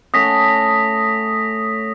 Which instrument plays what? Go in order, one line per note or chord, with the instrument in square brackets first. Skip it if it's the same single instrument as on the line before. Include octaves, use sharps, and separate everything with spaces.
[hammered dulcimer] A3 C#4 F#5 [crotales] D#6 A#6 B6